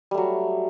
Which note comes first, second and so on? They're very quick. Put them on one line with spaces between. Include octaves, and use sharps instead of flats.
G3 A3 F#3